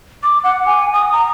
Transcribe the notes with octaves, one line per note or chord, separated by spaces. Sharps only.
D6
F#5
G#5
D#6
A#5